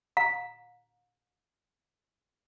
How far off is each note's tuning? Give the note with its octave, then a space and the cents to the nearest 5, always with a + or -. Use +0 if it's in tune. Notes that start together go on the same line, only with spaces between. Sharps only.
F5 +45 A#5 +0